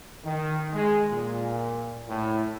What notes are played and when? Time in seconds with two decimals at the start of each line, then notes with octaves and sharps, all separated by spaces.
0.25 D#3
0.73 G#3
1.10 A#2
2.09 A2